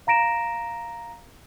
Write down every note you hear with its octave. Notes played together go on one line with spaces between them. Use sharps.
F5 A#5 A#6 D7 E7